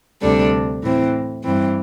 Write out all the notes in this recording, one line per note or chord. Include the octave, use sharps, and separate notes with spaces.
D2 C3 G3 D4 A4
A2 E3 C4
G2 E3 C4